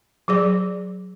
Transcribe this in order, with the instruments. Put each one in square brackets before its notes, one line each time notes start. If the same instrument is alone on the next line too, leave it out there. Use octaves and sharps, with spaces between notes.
[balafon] F#3 G#4 D5